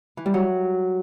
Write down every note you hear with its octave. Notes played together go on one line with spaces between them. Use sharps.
E3
G3
F#3